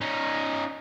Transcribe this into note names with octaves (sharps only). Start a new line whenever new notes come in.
C#4 D#4